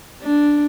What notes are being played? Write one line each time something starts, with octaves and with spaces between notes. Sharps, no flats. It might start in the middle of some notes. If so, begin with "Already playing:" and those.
D4